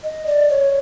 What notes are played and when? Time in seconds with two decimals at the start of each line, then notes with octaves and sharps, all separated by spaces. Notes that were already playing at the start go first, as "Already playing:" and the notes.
0.04 D#5
0.27 D5
0.50 C#5